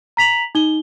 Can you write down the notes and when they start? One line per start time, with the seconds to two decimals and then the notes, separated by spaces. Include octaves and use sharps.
0.17 A#5 B6 F7 F#7
0.55 D#4 G7